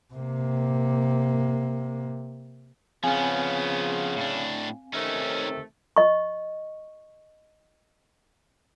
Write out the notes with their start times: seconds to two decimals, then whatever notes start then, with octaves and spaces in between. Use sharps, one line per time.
0.14 C3 A#3
3.04 C#3 F3 B3 C4 F5 G#5
4.16 A2 D4
4.94 C3 D#3 A3 C#4 D#4
5.96 D#5 C#6